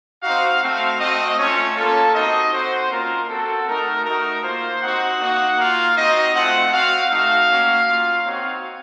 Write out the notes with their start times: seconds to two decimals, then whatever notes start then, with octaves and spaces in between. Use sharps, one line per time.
0.23 C4 D#4 F#4 F5
0.62 A3 C4 F#4 F5
0.99 A3 C4 F#4 D#5
1.38 A3 C#4 F4 C#5
1.76 A#3 C#4 F4 A4
2.14 C4 D#4 F#4 D#5
2.53 C4 F#4 C5
2.91 A#3 C#4 F4 A#4
3.29 C4 F#4 A4
3.67 A3 D#4 F#4 A#4
4.05 A3 D#4 F#4 A#4
4.43 A#3 F4 C5
4.82 C4 D#4 F#4 F#5
5.20 A#3 D#4 F#4
5.58 A#3 F4 F5
5.96 C4 D#4 F#4 D#5
6.34 A3 C4 F4 F#5
6.73 C4 F#4 F5
7.11 A3 D#4 F#4 F5
7.50 A#3 C#4 F#4
7.87 A#3 F4
8.25 C4 D#4 F#4 C#5